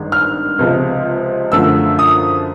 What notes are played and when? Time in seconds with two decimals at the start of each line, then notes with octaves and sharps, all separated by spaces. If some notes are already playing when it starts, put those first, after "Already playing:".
Already playing: G#1 G2 D#3 G#3
0.12 F6
0.59 C#2 C3 F3 G#3
1.52 F#2 D3 F3 A3 E6
1.99 D#6